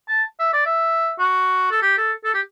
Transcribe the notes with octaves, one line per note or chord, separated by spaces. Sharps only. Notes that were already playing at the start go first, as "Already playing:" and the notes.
A5
E5
D5
E5
F#4
A4
G4
A4
A4
G4